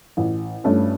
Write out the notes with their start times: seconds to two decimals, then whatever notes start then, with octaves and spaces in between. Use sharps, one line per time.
0.17 A1
0.64 G2 A3 C#4